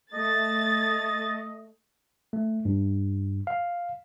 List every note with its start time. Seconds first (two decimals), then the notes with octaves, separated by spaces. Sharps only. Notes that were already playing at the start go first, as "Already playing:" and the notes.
0.13 A3 D#5 A6
2.33 A3
2.65 G2
3.47 F5